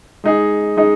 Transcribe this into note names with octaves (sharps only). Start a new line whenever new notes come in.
G#3 D#4 G#4
G#3 D#4 G#4